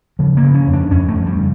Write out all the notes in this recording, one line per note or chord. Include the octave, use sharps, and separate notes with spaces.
C#3 F3
A#3
C#3
C#4
F2
D4
F2 C#4
A3
F2
G3
C#3